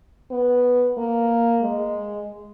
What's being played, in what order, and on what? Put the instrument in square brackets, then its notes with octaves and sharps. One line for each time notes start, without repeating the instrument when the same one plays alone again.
[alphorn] B3
A#3
G#3